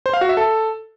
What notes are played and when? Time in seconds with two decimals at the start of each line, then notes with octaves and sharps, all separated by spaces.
0.06 C5
0.13 F5
0.21 F#4
0.29 E5
0.37 A4